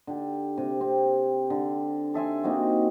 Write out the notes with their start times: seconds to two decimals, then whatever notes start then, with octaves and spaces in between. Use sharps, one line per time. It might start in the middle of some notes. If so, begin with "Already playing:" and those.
0.07 D3 G4
0.58 C3
0.81 C4
1.50 D3
2.14 A4 E5 G#5 C6
2.44 A#3 C4 D#4 F#4